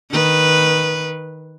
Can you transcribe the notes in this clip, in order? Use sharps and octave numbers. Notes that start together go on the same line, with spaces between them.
D#3 B4